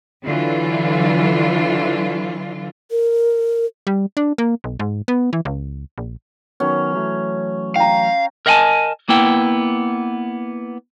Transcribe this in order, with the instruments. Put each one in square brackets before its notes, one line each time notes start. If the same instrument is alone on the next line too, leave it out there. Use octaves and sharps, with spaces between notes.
[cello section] D3 E3 F#3 F4
[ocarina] A#4
[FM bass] G3
D4
A#3
B1
G#2
B3
E3
C#2
A#1
[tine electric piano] D#3 F#3 B3 [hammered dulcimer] C#4
[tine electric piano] E3 F#3 A3
[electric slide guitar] F5 [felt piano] G5 A#5
[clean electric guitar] A#4 D#5 F5 F#5 G#5 A5
A#3 B3 E4 G5